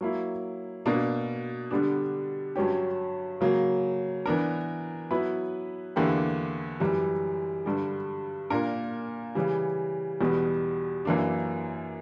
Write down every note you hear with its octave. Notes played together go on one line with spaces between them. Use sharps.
F#3 A#3 E4
B2 A#3 D4
D3 G3 B3 D4
G2 F#3 C#4 G4
C#3 F#3 A#3
E3 B3 D4 A#4
F#3 B3 E4 B4
E2 D3 A#3 E4 G4
F#2 E3 G3
G2 D3 G3
A#2 A#3 D4 A#4
C#3 E3 G3
E2 B2 G3 B3
F#2 E3 A#3 D4